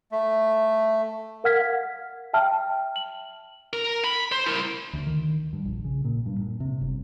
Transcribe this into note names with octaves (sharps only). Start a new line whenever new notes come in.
A3
A#4 F5 F#5 F6 G#6 B6
F#5
E5 G5 A5 F6
F#7
A#4
B5
C5
E4 A#4
D2
D#3
G2
A#1
C#3
A#2
G2
A#2
C3
G1